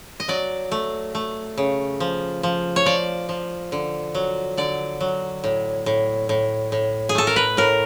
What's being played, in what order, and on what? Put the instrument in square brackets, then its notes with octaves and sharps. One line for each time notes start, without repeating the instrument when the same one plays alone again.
[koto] D#5
F#3 D5
A3
A3
C#3
F3
F3
C#5
F3 D5
F3
D3
F#3
D3 D5
F#3
A2
A2
A2
A2
G#4
A3 A4
A#4
B4
A2 A#4